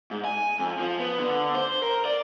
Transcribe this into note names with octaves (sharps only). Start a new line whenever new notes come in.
G#2
G#5
F2
F3
B3
D3
C5
A#4
D5